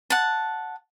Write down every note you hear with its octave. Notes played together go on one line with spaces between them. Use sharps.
F#5 A5